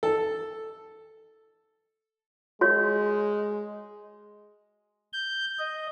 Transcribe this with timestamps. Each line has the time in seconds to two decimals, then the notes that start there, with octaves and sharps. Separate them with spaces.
0.03 A4
2.61 G#3 F#4 C#5
5.13 G6
5.59 D#5